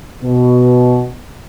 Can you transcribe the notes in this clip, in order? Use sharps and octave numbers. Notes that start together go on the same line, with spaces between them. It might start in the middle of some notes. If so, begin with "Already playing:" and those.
B2